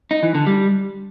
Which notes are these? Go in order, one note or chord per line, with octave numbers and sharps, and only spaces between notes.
D#4
E3
D3
G3